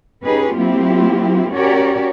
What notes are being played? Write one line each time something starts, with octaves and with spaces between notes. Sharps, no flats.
C#4 D#4 G4 G#4 B4
F#3 A#3 C4 E4 F4 G4
C#4 F#4 G4 A#4 C#5 D5